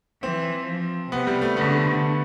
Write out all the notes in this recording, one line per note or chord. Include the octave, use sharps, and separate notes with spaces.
E3 C4
F3
C3 B3
G3
A3
D3 B3